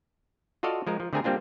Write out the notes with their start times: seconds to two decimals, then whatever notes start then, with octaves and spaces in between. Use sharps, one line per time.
0.63 F4 F#4 A4 D5 D#5 F5
0.87 F3 G#3 A#4
1.00 F3
1.13 D3 A3 C4 G#4 A#4 G#5
1.24 G3 A#3 C4 D4 F4